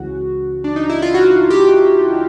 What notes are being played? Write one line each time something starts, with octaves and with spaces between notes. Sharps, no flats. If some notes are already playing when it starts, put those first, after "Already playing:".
Already playing: C#2 C#3 E3 F#4
D4
D#4
E4
F4
F#4
G4